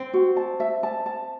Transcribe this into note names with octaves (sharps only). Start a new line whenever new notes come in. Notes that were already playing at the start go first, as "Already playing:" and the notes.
Already playing: C4
F#4
A5
E5
A5
A5